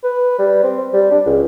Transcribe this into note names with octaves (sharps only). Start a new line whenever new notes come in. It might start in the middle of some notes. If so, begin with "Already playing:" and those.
B4
G3
C4
G3
D4
C#2